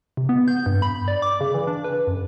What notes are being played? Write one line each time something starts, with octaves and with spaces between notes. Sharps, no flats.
C3
B3
G6
G2
B5
D5
D6
C#3
E3
D4
B4
F#2